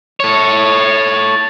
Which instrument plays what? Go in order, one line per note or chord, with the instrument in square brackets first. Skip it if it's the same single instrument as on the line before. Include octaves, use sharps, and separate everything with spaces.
[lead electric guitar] A4 C#5